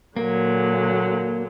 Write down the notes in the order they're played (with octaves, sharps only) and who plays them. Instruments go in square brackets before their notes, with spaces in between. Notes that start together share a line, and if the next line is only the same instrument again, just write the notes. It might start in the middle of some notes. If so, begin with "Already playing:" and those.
[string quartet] A#2 D3 F#3 [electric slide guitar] A#3